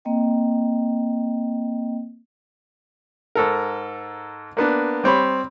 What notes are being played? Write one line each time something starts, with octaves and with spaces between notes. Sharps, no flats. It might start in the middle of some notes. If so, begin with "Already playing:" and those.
A#3 C4 D#5 G5
G#2 A4 A#4
A#3 B3 D4
G3 C4 C#5 B5